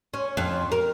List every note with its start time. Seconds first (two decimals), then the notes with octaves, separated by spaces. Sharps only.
0.14 C#4
0.37 F2
0.72 A#4